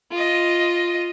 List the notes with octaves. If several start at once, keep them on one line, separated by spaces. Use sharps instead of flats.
F4 D#5